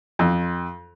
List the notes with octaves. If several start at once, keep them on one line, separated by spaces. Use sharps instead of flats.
F2